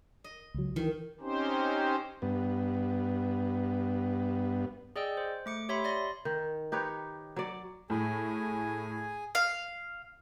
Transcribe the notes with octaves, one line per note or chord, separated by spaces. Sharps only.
D#5
C#2 F#3
D#3 E3
C4 C#4 D#4 G4 C5
G2 B3
G#4 D5 D#5 G5 E6
C5
A3 D6 C#7
G4 C#5 E5 B5 C6
D5 C6 A#6
D#3
D#4 G4 B4 C#5
F#3 D5
A2 G#4 G#5
F5